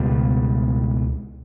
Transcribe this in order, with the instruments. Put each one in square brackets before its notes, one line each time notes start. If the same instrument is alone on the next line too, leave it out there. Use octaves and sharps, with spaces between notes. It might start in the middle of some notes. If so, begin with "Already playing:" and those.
Already playing: [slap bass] C#2 B2 G3